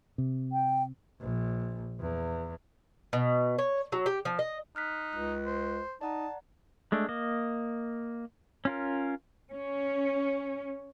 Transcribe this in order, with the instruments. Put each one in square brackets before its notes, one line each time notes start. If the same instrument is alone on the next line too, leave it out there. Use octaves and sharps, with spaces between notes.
[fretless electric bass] C3
[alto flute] G5
[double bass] A#1
E2
[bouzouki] B2
C#5
F#3
G4
F3
D#5
[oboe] D#4 [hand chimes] F6 F#6 B6
[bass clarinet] C#2 [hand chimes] F#6
[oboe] C5
[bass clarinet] D#4 [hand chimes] D5 F#5 A#5 [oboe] A5
[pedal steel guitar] G#3 A3 D4
A#3 D#5
C#4 F4 A#4
[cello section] C#4